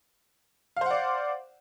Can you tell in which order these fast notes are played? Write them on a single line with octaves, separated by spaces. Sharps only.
F5 C5 F#5 D5